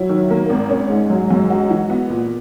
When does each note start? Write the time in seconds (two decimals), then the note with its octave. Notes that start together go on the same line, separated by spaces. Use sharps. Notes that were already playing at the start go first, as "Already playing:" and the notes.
Already playing: F#3 E4
0.09 D#3
0.30 A#3
0.50 G#1
0.70 C#4
0.90 G#2 G#3
1.10 F#3
1.30 F#2
1.50 F#4
1.70 E3
1.90 B3
2.10 A#2